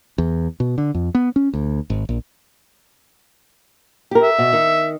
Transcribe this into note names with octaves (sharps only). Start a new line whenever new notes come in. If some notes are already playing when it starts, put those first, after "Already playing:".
E2
B2
D3
F2
B3
C#4
D2
G#1
A#1
G4 A#4
E5
B2
D#3